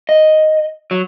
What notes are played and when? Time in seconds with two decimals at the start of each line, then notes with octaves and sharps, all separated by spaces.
0.09 D#5
0.91 F#3